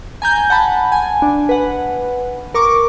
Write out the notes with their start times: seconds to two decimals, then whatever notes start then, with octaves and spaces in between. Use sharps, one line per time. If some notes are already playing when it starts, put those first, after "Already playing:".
0.22 G#5 A#5 G6
0.50 F#5 A5 B5
0.92 G#5
1.22 D4
1.49 B4 F#5
2.54 A#4 C#6 D6